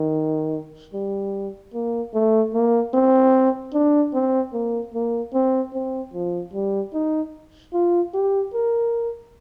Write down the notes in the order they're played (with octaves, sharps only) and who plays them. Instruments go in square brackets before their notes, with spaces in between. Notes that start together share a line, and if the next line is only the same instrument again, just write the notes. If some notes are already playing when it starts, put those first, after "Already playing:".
Already playing: [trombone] D#3
G3
A#3
A3
A#3
C4
D4
C4
A#3
A#3
C4
C4
F3
G3
D#4
F4
G4
A#4